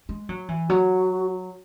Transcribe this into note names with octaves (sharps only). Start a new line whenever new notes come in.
G#3
F#3
E3
F#3 F#4